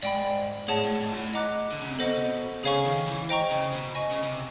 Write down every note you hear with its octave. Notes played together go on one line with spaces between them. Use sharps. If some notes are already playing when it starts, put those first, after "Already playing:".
G#2 D5 G5 B5
A2 G#4 C#5 F#5 A5
A2
G#2
A#2
A2
D#5 F#5 A#5 D6 F#6
D3
C#3
C3
B2 A4 C5 D#5 F#5
C#3 G#4 C#5 F5 G#5 C#6
D#3
E3
C5 D#5 G5 A#5 C#6
C#3
B2
D#5 G#5 C#6
C#3
C#3
C3